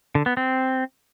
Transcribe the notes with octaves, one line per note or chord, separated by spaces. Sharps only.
D3
B3
C4